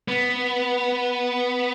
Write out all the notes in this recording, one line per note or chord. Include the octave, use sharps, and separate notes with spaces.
B3